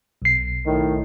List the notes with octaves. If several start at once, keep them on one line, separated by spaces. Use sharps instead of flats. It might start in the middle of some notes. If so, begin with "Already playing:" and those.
B1 C7
A2 D#3